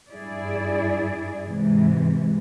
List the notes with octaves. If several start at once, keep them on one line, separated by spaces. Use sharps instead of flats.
G2 E4 G#4 D5
G#2 C3 E3